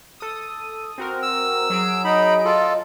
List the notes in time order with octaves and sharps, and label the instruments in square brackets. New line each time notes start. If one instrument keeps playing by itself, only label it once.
[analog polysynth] A4 D#6
C4 F#4 A#4
[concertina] E6
[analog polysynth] F#3 G#4 D7
[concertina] D#4 B5 [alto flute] D#5
[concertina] F4 A4